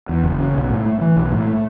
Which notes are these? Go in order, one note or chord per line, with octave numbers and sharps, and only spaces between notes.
E2
F#1
C#3
B1
A2
A3
E3
B1
A2
A3